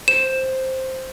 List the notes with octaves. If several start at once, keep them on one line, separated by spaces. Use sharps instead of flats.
C5 E7